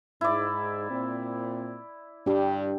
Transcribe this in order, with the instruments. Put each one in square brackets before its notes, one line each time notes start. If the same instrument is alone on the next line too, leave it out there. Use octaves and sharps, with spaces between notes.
[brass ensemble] G#2 [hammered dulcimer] E4 D5
[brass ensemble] A#2 C4
[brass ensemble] G2 G3 [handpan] D4 G4